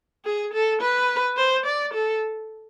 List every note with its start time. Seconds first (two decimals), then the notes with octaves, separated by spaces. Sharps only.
0.25 G#4
0.53 A4
0.81 B4
1.37 C5
1.66 D5
1.94 A4